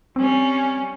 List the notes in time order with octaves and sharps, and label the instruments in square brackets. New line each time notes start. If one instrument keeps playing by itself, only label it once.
[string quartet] G3 C#4 [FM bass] C4